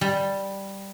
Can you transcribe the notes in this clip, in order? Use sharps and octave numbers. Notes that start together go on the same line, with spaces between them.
G3